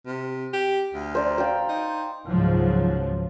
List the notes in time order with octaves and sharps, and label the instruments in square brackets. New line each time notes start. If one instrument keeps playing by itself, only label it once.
[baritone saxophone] C3
G4
D2
[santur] C5 D5 A#5
D5 F5 G5
[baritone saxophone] D#4
[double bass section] C#2 G#2 F3 F#3